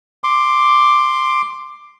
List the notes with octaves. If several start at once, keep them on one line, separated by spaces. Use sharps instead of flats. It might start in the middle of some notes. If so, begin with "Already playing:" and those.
C6 D6